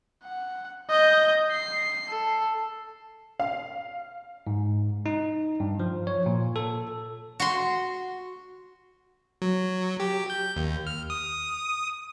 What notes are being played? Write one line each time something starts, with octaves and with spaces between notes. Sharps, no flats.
F#5
D#5 G6
C7
A4
F5
G#2
D#4
G2
F3
C#5
A#2
A4
F#4 C6
F#3
G4
G6
D#2
F6
D#6